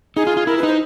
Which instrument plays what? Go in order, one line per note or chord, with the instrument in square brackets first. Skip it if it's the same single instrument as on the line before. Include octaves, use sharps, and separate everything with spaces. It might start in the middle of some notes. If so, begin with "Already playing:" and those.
[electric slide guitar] D#4 [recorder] G#4
[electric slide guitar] F4
F4
[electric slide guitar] E4 [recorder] A#4
[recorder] B4
[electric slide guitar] D#4 [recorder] C5